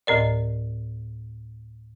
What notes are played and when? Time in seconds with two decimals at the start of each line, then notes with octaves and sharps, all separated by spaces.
0.07 D2 A2 A#4 D5